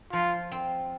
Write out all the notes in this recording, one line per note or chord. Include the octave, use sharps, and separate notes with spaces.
F3 F4
C4